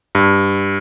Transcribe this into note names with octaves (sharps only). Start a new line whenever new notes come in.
G2